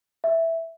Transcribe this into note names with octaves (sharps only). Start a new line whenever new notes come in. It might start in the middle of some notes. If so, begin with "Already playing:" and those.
E5